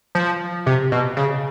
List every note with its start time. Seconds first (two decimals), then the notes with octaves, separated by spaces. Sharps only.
0.15 F3
0.66 C3
0.92 B2
1.17 C#3